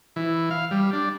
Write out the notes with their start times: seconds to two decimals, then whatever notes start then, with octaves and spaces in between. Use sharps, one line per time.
0.16 E3
0.51 F5
0.71 G3
0.93 D4